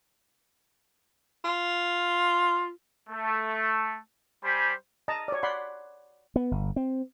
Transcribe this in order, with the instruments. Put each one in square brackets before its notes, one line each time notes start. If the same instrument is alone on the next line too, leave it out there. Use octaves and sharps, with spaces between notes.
[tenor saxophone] F4
[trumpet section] A3
G3 G4 C5 G#5 B5
[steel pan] D#5 A5 A#5
C#5 D5
D5 F#5 B5 C6
[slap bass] B3
G1
C4